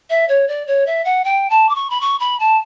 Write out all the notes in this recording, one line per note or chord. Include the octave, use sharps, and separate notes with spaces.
E5
C#5
D5
C#5
E5
F#5
G5
A5
D6
C#6
B5
C#6
B5
A5